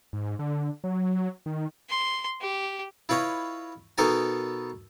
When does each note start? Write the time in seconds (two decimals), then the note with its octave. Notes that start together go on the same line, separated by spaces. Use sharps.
0.13 G#2
0.39 D3
0.84 F#3
1.46 D#3
1.89 C6
2.41 G4
3.09 E4 F4 B4 C#5 D#5
3.98 B2 B3 D#4 A4 A#4 G#5